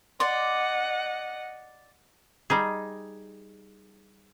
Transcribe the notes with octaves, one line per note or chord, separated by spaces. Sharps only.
D5 D#5 F#5 C6
G3 D#4 G#4